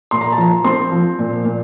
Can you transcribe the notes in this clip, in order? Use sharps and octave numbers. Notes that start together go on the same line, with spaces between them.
A#2 C6
A#5
A5
F3 A#5
C4 C6
F3
A#2
A#2